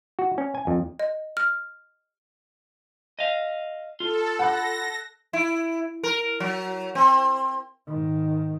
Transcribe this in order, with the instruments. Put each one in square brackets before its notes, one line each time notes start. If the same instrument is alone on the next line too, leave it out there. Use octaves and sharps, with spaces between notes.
[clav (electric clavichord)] F#4
C#4
G#5
F2
[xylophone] D#5
F6
[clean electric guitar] D#5 F5
[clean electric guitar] F4 [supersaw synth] A4
[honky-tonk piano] F#5 B5 F#6 [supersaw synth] A#6
[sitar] E4
A#4
F#3
C4
[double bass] G#2 D#3